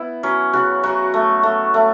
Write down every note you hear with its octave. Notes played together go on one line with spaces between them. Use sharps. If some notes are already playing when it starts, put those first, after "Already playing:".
Already playing: B3 E4
F#3 C#4
C#3 F#4
F#3 F#4
A3
A3
A3